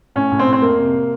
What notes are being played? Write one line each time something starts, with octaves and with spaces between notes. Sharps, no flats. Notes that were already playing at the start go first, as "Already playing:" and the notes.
A2 C#4
A2
C4
A2
C4
F2 A#3
C3